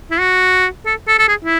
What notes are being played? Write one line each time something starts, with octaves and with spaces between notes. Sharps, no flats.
E4
F#4
A4
A4
A4
G#4
E4